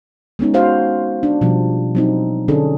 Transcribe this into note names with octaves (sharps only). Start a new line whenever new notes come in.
G#3 B3 C#4 D#4
F#4 C5 F5
D4
B2 F3 G3
F#3 C4 D#4
D3 C#4 D4 G#4 A4